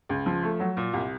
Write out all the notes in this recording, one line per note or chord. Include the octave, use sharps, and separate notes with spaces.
C#2
F3
A3
F#3
A#2
C2